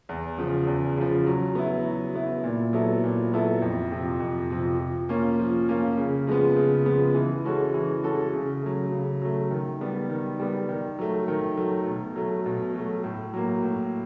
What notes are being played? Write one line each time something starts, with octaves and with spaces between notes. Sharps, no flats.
E2
C#3 F3
E2
C#3 F3
F#3
B3 E4
F#3
B3 E4
A#2
F#3 B3 E4 A4
A#2
F#3 B3 E4 A4
F2
C3 F3
F2
C3 F3
F3
A#3 C#4 F4
F3
A#3 C#4 F4
C#3
F3 G#3 B3
C#3
F3 G#3 B3
E3
G#3 C#4 F#4 A4
E3
G#3 C#4 F#4 A4
C#3
F#3 A3
C#3
F#3 A3
D#3
G3 B3
D#3
G3 B3
D#3
F#3 A3
D#3
F#3 A3
B2
F#3 A3
B2
F#3 A3
A2
F#3 A#3
A2